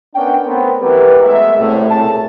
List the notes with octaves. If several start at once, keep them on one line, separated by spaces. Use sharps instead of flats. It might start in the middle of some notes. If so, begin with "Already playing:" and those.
B3 C#4 D4 A#4 F#5 G5
A3 B3 C4 A4 A#4
E3 F#3 G4 A#4 B4
G#3 A3 B3 G#4 E5
C2 A2
B1 A#2 A3 G#4 A4 A5